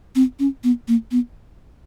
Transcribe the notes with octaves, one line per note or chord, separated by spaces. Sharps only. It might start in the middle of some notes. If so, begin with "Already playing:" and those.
C4
C#4
B3
A#3
B3